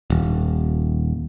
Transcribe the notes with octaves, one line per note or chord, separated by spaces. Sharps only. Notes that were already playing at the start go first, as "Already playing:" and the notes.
D#1